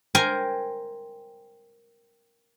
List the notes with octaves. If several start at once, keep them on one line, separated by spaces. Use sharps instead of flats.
A#4 C5 G5 G#5